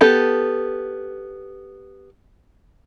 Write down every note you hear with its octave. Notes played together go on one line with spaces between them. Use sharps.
B3 G4 A4